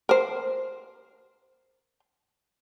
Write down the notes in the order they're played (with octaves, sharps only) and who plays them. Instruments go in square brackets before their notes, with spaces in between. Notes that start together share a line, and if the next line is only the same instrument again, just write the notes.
[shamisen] A#4 C5